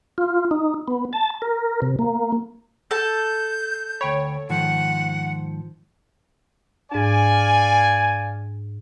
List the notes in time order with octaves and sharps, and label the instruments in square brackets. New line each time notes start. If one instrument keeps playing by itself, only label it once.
[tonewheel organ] F4
D#4
B3
A5
A#4
C3
A#3
[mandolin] A4 A5 [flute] G6
[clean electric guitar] D2 G5 B5 [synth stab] C#5
[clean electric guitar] G#2 D#3 F3 [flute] F#5
[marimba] G#2 D4 [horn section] D5 F5 G#5